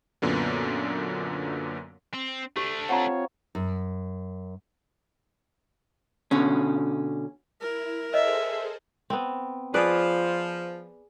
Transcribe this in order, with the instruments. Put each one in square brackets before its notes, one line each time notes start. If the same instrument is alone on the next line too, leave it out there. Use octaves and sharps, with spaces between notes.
[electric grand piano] F#2 A#2 D3 B3
[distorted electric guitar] C4
[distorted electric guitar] A3 D4 [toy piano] G4
[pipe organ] C4 F4 C#5 [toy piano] F#5 A5 A#5
[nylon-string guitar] F#2
[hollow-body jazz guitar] B2 D3 C#4
[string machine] E4 [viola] A#4
[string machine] G#4 A4 C5 [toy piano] C#5 D#5 [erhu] E5
[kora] B3 C4
[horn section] F3 [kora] G#4 B4 D5